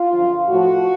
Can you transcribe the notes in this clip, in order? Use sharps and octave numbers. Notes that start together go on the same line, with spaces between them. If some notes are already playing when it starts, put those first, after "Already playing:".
Already playing: F4
F#2 D3 F3
A2 F3 F#4